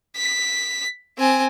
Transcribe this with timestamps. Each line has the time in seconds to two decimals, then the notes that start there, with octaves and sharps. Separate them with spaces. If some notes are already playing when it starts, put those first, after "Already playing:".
0.17 B6
1.18 C4 G#5